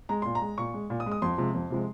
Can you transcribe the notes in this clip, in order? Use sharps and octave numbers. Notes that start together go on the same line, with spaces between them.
G#3 A#5
A#2 C6
A#5
G#3
A#2 C#6
G#3
A#2
D#6
G#3
D#6
F2 C6
C3 F3 G#3
F2
C3 F3 G#3